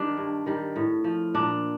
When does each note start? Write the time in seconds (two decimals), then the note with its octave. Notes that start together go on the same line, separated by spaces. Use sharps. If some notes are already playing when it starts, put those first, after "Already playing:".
Already playing: D#3 G3 D4
0.17 G2
0.46 D#3 G3
0.76 A2
1.04 F3
1.35 A#2 D4